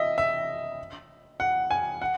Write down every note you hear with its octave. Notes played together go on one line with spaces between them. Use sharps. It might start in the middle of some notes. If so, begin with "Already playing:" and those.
Already playing: D#5 E5
E5
F#5
G#5
F#5